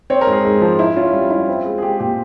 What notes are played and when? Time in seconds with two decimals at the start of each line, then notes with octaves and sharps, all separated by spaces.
0.10 C4 C#5
0.21 A#4
0.27 G#2
0.32 G#4
0.45 G#2
0.61 F3
0.79 E4
0.96 C#4 F4
1.13 G3
1.31 E4
1.48 C4
1.65 G#3
1.78 G#4
1.82 G#3 G4
2.00 A#2 G4